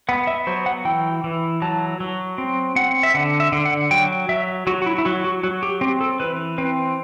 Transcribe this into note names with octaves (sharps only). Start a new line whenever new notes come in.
B3 F#5
E5
F#3 C5
F#5
E3 G5
E3
F#3 A5
F#3
C4
C4 F#5
E5
D3 F#5
E5
D3
F#5
F#3 G5
F#3 E5
F#3 F#4
F#4
E4
E4
F#3 F#4
F#4
F#3 F#4
G4
C4 G4
A4
E3 B4
C4 B4